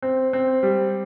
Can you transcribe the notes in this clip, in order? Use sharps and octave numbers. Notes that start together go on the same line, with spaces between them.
C4
C4
G3